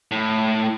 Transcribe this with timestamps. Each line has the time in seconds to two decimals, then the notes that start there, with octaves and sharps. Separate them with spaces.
0.11 A2